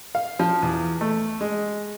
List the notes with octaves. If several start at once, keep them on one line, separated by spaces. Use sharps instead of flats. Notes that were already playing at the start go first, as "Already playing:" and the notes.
F5
F3
E2
A3
G#3